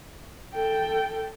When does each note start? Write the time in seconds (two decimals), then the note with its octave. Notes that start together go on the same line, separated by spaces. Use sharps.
0.54 A4 G5